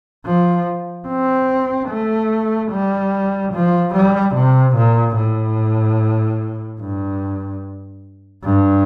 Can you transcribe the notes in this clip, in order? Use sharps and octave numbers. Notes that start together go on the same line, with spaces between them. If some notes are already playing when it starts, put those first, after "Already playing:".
F3
C4
A3
G3
F3
G3
C3
A#2
A2
G2
G2